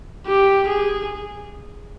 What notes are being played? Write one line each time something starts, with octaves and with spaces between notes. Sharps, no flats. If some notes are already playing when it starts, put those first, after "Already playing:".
G4
G#4